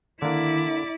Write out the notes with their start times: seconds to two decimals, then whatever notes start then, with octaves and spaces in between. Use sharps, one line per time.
0.22 D3 D#3 A#3 E4 D5